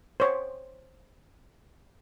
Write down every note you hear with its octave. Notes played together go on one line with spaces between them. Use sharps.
C5 C#5